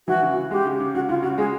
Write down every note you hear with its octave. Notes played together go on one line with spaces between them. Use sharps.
E3 F#4
C#3
C#3
G#3 G4
C#3
C#3
C#3 F#4
C#3 F4
C#3 F#4
G#3 G#4